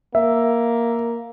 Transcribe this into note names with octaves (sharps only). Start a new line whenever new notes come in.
A#3 E5